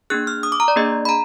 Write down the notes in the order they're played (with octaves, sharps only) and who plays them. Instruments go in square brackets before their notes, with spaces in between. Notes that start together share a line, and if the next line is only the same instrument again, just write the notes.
[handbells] A#3 D4 G#4 F#6
F6
D#6
D6
A#5
D5
A#3 D4 G#4 D#5
B5
A#5